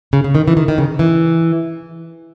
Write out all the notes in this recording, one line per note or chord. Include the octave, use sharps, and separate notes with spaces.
C#3
C#3
D#3
E3
D#3
D#3
C#3
E3